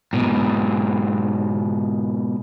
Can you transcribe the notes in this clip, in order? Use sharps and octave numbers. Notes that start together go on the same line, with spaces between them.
G#2 B2